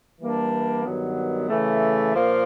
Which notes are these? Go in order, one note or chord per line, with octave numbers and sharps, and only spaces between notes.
E3 G3 A#3 D4
G2 D#3 F#3 B3
C#3 E3 A3
A#2 F3 A#3